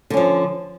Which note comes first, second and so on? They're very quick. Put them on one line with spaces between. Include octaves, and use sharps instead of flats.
D3 C#4 F3